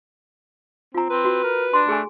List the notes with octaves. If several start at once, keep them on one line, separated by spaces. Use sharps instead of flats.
C4 F4 A#5
C4 B4
F#4
A#4
D4 C6
A3 G#4 G#5